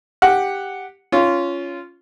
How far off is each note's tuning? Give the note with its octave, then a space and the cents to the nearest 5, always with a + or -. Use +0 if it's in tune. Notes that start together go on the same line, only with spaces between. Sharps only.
G4 +5 F#5 +0
C#4 +10 F4 -10